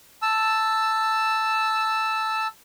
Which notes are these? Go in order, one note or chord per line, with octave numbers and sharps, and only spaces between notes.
A5 E6